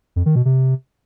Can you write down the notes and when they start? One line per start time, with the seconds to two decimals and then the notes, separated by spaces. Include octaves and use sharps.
0.16 F2
0.26 D#3
0.36 B2
0.45 C3